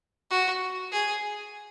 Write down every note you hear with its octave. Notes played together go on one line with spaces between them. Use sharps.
F#4
G#4